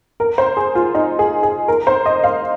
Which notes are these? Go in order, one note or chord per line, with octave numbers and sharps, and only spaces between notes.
A#4
C5
G#4
F4
D#4
G#4
G#4
A#4
C5
D#5
F5